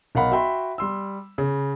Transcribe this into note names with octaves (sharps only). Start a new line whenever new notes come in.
B1 A#4 F5 F#5 B5
F#4 E5 G5 B5 C6
G3 C6 E6
C#3